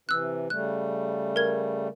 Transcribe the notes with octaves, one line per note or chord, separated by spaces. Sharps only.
C3 E3 E6 F#6
C#3 G3 A3 F#6
A#4 G#6